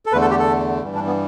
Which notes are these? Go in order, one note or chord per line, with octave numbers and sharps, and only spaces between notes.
A4
E2 D3 A3 B4
A4
G4
A4
G2 E3 G3
D4
B3